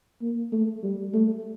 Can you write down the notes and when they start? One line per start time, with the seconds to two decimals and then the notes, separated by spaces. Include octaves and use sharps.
0.21 A#3
0.52 A3
0.83 G3
1.14 A3